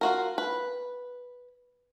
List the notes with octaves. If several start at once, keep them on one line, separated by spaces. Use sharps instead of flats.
F4 F#4 A#4
B4